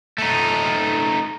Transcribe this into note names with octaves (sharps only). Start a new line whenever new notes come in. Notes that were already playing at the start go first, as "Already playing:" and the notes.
A3 D#4